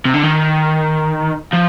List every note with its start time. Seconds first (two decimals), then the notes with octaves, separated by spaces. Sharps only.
0.05 C3
0.14 D3
0.23 D#3
1.53 F3